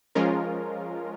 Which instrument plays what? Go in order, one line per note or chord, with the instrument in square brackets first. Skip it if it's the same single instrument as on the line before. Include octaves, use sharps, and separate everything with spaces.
[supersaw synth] F3 G#3 C#4 F4 A#4